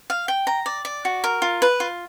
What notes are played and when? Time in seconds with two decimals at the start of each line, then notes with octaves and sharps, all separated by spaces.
0.10 F5
0.28 G5
0.47 A#5
0.66 D5
0.85 D5
1.05 F#4
1.24 A#4
1.42 F4
1.62 B4
1.80 F4